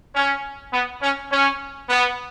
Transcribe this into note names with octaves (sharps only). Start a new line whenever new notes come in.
C#4
B3
C#4
C#4
B3